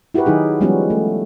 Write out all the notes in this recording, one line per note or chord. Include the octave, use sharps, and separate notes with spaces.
E4 F#4 G4 A#4 B4
D#3 F#3 D#4 G#4
F3 G3 G#3 B3 C#4 F#4
A3